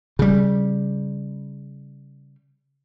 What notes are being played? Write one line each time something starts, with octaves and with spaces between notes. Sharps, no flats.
C#3 G3